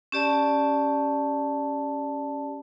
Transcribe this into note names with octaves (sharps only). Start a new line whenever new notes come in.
C#4 G4 D5 A5